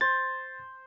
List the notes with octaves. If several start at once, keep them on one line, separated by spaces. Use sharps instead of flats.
C5 A6